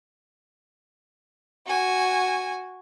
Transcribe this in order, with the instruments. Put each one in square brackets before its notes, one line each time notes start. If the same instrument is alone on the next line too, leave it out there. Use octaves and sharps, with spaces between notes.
[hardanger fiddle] F#4 G#5